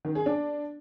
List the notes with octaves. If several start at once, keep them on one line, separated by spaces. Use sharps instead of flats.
D#3
G#4
D4